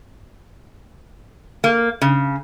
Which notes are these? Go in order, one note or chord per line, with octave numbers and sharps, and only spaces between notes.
A#3
C#3